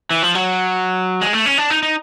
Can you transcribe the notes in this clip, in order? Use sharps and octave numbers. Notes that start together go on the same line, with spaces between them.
E3
F3
F#3
G#3
A3
C#4
D4
D#4
D#4